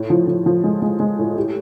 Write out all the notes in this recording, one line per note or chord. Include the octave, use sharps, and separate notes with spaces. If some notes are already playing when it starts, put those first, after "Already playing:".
Already playing: A2
F3
F3
F3
G#3
G#3
G#3
A2
G4